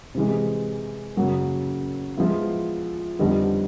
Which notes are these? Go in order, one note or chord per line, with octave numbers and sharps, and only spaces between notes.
C3 E3 G#3
F#2 C#3 F#3 A#3
F3 G#3 B3 E4
F2 D3 G3 B3 D#4